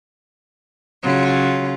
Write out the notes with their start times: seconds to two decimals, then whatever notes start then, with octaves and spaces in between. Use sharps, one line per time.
1.03 C#3 F#3 F4